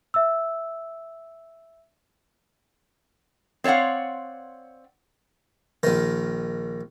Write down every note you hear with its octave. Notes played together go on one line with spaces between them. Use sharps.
E5 E6
C4 C#5 D5 F5 F#5
A#1 D#3